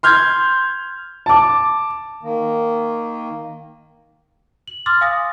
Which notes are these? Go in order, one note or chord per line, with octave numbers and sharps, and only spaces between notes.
C6 F6 G6 G#6
A5 D6
D#3 A#3
F#7
C6 D6 E6 F6 A6
F5 G#5 D#6 A#6